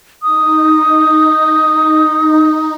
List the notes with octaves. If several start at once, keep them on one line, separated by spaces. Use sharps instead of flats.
D#4 D#6